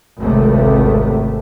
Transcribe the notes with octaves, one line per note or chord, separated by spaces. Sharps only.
G#1 C#2 C3 A3